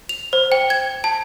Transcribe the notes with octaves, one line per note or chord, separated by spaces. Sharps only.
F7
C5
G5
G#6
A5